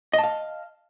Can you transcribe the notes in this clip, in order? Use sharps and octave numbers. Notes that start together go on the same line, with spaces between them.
D#5 F5 A5